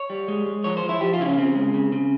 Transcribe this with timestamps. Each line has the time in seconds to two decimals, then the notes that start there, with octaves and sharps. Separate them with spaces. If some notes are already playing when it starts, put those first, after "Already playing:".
Already playing: C#5
0.10 G3
0.28 G#3
0.46 G#3
0.64 F3 C#5
0.77 C5
0.83 F3
0.89 E4
1.01 F3 G4
1.14 F4
1.19 C#3 E4
1.26 C#4
1.37 C#3 C4
1.55 G#3
1.74 C#3
1.92 C#3